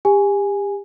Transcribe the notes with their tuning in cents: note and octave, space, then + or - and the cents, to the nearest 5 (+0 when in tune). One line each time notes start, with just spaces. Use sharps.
G4 +30 G#5 -5